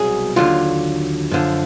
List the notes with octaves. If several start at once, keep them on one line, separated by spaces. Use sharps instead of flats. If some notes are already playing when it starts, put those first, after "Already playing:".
Already playing: C2 B2 F#3 G#4
D#2 D3 F#3 F4
F#2 D3 F3